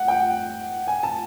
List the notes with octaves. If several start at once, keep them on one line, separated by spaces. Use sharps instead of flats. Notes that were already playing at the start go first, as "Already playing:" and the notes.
Already playing: F#5
G5
G#5
A5